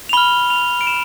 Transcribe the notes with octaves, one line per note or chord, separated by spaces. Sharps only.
F7
B5 F6 G7
F7
D7
E7